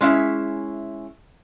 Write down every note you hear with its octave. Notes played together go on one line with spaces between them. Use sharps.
G#3 C#4 E4 E5